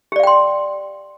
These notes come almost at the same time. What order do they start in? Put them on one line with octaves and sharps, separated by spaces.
G4 D5 F5 G5 C6